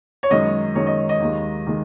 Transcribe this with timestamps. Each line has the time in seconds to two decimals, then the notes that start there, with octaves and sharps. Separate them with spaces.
0.23 C#5
0.30 F#2 D#3 G#3 D#5
0.75 F#2 D#3 G#3 C#5
0.87 D#5
1.09 D#5
1.20 D#2 D#3 G#3
1.67 D#3 G#3